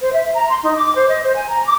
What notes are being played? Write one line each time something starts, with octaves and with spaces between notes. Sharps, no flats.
C5
E5
A#5
C6
D#4
D6
C5
D#5
C5
G#5
A#5
D6